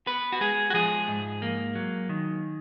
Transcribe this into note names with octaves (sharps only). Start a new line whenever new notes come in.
B3 B4
F#4
G#3 G#4
F#4
F3 G#4
G#2
A#3
F#3
D#3